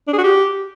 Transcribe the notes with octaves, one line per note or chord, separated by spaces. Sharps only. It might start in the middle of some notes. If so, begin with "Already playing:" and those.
D4
G#4
F#4
G4